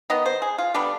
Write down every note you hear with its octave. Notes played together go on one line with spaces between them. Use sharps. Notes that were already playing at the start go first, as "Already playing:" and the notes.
D#3 B3 D#5
C5
G#4
F4
D3 G3 B3 D4